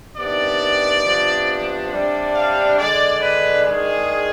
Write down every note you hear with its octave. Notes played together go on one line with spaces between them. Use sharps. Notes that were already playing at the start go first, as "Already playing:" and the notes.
C3 D#3 B3 D4 D5
C3 F3 B3 D4
C3 G3 D4
F5
D3 G#3 D4 D5
B4
D#3 G#3 D4 G#4